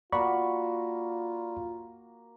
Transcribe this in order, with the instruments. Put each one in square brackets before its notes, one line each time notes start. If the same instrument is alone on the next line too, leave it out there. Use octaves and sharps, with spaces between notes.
[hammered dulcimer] A#3 F#4 [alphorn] F4 [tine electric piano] D5 B5 C#6